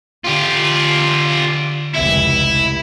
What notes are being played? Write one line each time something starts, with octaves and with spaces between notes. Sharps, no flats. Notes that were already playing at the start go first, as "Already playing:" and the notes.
D3 F4 G4
F1 C#2 E4 E5